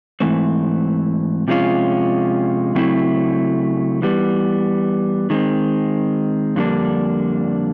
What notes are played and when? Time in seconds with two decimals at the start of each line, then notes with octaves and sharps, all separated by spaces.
0.20 G#2 E3 A3 C4
1.48 C3 F3 G#3 C#4 F4
2.75 C#3 F#3 A3 C4 E4
4.02 E3 G3 B3
5.30 D#3 G#3 C4
6.56 F2 D3 G3 A#3 D4